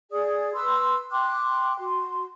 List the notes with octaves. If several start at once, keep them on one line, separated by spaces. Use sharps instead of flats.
G#4 D5 D#6
B4 C6 E6
G5 C6 D6 F#6
F#4 C6